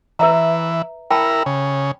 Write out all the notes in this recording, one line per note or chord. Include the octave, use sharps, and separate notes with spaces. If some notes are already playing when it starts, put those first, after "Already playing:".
E3 B4 E5 A#5
E4 A#4 G5 A5 B5
C#3